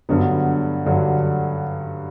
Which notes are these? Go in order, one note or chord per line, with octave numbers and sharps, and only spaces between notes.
G2 D3 F#3 B3
G2 D3 F#3